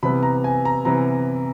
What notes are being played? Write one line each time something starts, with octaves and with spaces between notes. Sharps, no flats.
C3 E3 G3 B3 B5
A#5
G#5
A#5
C3 E3 G3 B3 A#5